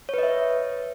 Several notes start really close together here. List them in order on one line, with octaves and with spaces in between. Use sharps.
C#5 B4 D#5 E5